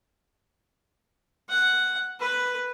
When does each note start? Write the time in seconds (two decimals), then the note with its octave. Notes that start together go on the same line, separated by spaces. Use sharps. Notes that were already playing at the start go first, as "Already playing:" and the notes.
1.49 F#5
2.20 B4